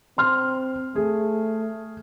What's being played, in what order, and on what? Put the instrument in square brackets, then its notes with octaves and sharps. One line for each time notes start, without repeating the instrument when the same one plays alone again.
[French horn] C4 [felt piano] C6 F6
[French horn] A3 [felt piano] G#4